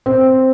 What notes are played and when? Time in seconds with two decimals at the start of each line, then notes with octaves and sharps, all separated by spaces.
0.06 C4